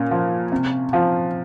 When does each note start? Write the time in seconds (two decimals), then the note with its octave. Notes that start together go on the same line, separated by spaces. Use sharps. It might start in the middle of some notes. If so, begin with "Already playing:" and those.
Already playing: A#2 C#4
0.11 F3
0.52 C3
0.93 F3